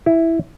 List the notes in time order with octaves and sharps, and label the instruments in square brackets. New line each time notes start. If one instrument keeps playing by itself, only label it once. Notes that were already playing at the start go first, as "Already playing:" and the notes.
[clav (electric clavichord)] E4